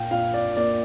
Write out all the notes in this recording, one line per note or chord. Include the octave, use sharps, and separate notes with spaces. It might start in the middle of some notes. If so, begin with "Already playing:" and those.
Already playing: A#1 F5 G5
A#2 F5
D5
A#3 D5